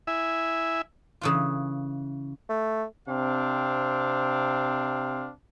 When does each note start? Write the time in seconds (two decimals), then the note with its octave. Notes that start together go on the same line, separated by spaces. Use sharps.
0.07 E4 E5 G#5
1.21 C#3 E3 F4
2.49 A3
3.09 C3 C4 D4 F5